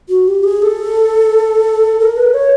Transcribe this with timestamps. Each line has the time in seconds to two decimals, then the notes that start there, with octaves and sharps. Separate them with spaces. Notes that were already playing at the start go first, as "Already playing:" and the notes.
0.09 F#4
0.28 G4
0.44 G#4
0.62 A4
2.00 A#4
2.17 B4
2.34 C#5